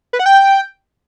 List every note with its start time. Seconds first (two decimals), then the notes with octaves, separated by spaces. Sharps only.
0.13 B4
0.19 F#5
0.26 G5